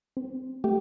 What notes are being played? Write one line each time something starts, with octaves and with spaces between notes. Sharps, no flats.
C4
A3 G4